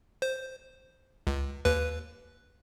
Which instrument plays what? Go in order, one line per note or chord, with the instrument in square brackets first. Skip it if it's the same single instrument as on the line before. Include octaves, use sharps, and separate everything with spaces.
[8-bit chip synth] C5
C#2
D#2 B4